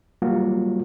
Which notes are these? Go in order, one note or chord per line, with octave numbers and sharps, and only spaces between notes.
F#3 G3 A#3 F4 F#4